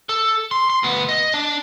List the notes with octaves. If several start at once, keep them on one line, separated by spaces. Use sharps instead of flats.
A4
C6
C6
D2 B3
D#5
D4 A5